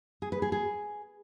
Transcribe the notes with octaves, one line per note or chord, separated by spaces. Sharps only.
G#4
B4
G#4
G#4